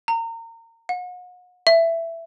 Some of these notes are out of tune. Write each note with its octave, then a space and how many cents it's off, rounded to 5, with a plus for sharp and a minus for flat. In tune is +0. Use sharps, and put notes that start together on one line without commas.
A#5 -30
F#5 -40
E5 +10